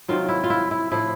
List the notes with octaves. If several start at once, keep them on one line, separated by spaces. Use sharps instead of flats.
C3 D#3 F#3 F4
E4
F4
E4
E4
A2 F3 E4